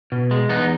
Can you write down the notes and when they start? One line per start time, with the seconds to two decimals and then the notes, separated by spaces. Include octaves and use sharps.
0.12 B2
0.31 G#3
0.49 E2 B3 D#4